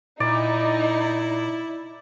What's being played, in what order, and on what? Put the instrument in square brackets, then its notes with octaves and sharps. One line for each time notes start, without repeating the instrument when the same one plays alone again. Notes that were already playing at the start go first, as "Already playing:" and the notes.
[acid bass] A#2 [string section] D#4 [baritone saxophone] E4 [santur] D5